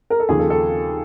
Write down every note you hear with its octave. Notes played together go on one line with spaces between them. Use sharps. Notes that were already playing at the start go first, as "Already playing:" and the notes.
A#4
A4
D#2 C#3 F3 G#4
A4
A4